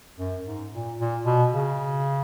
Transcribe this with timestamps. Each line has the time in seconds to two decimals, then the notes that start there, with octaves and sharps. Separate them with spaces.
0.18 F#2
0.45 G#2
0.72 A#2
0.99 A#2
1.25 B2
1.53 C#3